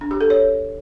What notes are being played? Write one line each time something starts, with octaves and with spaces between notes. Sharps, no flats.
D4
G4
A4
C#5